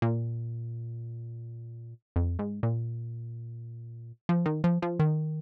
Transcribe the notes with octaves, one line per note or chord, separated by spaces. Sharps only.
A#2
F2
G#2
A#2
F3
D#3
F3
F3
D#3